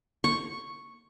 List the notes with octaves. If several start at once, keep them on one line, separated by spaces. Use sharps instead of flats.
C#6